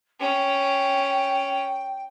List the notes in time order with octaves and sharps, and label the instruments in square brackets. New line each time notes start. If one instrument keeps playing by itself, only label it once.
[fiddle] C#4 [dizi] G5